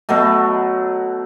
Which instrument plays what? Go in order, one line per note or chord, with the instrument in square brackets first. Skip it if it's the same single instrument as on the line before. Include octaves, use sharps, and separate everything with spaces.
[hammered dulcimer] B2 F#3 A3